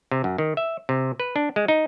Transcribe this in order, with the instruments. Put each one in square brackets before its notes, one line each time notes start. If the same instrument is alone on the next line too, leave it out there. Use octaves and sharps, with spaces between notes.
[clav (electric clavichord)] C3
F#2
D#3
E5
C3
B4
D4
G#3
D#4